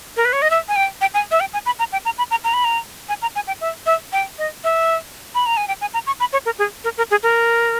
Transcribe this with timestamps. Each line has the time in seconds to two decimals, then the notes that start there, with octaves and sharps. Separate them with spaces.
0.17 A#4
0.25 B4
0.33 C#5
0.42 D#5
0.50 E5
0.68 G#5
0.76 G5
1.01 G5
1.14 G#5
1.31 E5
1.40 G5
1.53 G#5
1.66 B5
1.79 A#5
1.92 G5
2.05 A#5
2.18 B5
2.31 A#5
2.44 A#5
2.54 B5
2.65 A#5
3.09 G#5
3.22 A#5
3.35 G#5
3.47 G5
3.61 E5
3.86 E5
4.13 G5
4.39 D#5
4.64 E5
5.35 B5
5.46 A#5
5.57 G#5
5.68 G5
5.81 G#5
5.94 A#5
6.07 C#6
6.20 B5
6.33 C#5
6.46 A#4
6.59 G#4
6.84 A#4
6.97 A#4
7.11 G#4
7.23 A#4